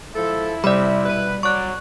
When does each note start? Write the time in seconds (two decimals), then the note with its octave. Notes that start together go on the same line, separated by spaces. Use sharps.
0.15 F3 G#3 E4 A4
0.64 C3 G3 D5 B5
1.05 B2 B4
1.43 F#3 D5 C#6 F#6